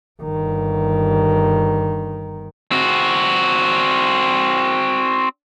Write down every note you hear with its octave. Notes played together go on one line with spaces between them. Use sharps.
G1 D#3
C4 F#4